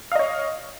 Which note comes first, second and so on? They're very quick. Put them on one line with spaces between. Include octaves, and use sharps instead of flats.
F5 D#5 C#5